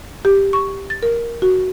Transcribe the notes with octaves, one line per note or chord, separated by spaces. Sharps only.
G4
C#6
A6
A#4
F#4